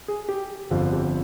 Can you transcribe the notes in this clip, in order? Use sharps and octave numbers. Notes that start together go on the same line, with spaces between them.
G#4
G4
G1 F2 D3 F3 F4
G4